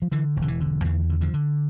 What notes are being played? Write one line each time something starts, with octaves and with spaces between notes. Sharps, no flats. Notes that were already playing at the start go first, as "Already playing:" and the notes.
F3
D3 E3
E1
D3
E3
D3
E2 E3
D3
D3 F3
D3